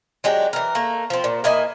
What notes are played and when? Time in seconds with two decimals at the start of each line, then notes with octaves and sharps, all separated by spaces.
0.24 F#3 G#3 D4 G4
0.53 E3 A#4
0.75 A3 A#3
1.10 F3 C4
1.24 A#2
1.44 A#3 E4 D#5 G#5